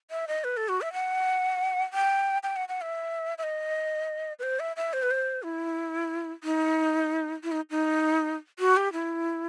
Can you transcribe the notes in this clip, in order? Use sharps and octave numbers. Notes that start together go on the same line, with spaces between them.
E5
D#5
B4
A4
F#4
E5
F#5
G5
G5
F#5
F#5
E5
E5
D#5
B4
C5
E5
E5
C5
B4
C5
E4
D#4
E4
D#4
D#4
F#4
G4
E4